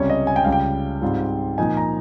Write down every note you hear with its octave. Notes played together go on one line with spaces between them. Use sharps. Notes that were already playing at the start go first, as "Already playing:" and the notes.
Already playing: C#2 C3 G3 C#4 C#5
D#5
G#5
G5
C#2 C#3 G3 F5
G5
G#2 G3 C4 F4
A#2 F3 A#3 D#4 G#5
A#5